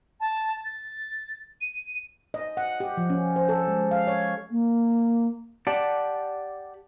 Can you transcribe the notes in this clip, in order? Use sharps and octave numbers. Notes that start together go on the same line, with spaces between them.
A5
A6
D#7
D#5
F#5
G4
F3
C#4
C5
A4
G#3
F5
C#5
A#3
G4 D5 F#5 G5 A5